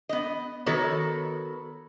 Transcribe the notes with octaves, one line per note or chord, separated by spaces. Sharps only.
B3 D#5
D#3 B3 F#4 A4 B4 C#5